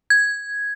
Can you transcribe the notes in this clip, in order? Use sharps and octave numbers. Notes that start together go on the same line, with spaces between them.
G#6